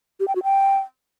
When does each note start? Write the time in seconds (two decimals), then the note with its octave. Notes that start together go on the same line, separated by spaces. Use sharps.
0.20 G4
0.28 G5
0.36 F#4
0.43 G5